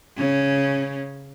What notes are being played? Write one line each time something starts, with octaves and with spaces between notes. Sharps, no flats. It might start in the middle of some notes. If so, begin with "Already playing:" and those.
C#3 C#4